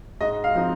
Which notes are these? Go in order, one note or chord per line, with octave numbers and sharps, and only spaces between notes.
G#2 D#5
F5
F3 C4 D#4